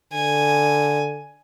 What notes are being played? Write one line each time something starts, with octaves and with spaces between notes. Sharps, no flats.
D3 G#5